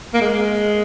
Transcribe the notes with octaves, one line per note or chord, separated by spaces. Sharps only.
A#3
G#3